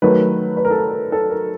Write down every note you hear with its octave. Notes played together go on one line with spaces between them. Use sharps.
D#3 F#3 A3 B4
B4
A#4
A4
A#4
A4
A#4